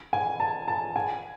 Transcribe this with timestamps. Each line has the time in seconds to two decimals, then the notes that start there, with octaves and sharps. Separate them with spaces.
0.13 G#5
0.40 A5
0.68 A5
0.96 G#5